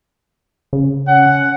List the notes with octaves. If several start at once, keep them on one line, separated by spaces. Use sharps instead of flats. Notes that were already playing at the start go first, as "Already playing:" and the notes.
C#3
C#4 F#5